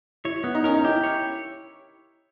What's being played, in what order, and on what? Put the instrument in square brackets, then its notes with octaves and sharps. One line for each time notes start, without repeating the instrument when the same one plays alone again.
[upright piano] E4 [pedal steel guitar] C#5
[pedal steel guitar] B3 [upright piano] E4
[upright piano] D#4
[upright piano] C#4 [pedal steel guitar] A#4
[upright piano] D#4
[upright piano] E4 [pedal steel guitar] G4
[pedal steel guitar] C#5